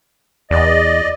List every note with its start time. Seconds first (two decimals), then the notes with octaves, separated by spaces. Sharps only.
0.51 E2 D5 D#5